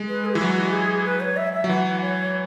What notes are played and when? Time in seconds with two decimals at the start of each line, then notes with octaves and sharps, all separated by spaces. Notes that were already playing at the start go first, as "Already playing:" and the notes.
Already playing: G#3
0.09 B4
0.25 G#4
0.35 E3 E4
0.41 F#3 F#4
0.73 G#4
1.06 B4
1.20 C#5
1.37 E5
1.53 E5
1.64 F#3
1.69 E3 F#5
2.02 C#5